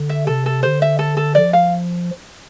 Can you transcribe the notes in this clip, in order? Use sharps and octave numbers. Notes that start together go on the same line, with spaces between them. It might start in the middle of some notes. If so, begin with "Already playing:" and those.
Already playing: D3
E5
C3 A4
A4
D3 C5
E5
A4
A4
F3 D5
F5